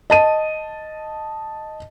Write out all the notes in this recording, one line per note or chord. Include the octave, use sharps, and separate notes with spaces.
D#5 A5 D#7